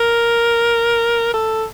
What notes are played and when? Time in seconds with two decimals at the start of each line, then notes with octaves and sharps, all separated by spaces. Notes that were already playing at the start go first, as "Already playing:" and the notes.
Already playing: A#4
1.34 A4